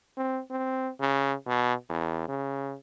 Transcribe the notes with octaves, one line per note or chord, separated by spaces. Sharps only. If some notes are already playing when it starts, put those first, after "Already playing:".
C4
C4
C#3
B2
E2
C#3